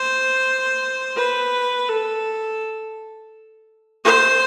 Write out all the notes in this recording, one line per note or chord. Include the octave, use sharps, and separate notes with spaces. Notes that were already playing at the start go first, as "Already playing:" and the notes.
Already playing: C5
B4
A4
C5